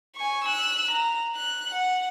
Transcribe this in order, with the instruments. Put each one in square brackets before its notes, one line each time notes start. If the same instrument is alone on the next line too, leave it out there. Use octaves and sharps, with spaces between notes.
[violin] G#5 C#6
E6 F#6
A#5
F#6
F#5